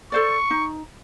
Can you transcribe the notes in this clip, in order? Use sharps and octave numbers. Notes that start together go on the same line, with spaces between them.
A4 C5 D5 C#6
D#4